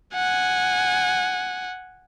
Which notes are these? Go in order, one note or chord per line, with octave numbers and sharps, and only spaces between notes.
F#5 G#5